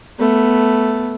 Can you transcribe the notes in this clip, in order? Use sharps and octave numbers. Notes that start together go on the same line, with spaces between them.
A3 B3